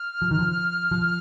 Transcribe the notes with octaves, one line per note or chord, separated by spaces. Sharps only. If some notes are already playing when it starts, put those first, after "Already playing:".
Already playing: F6
F3
D#3
F3
F3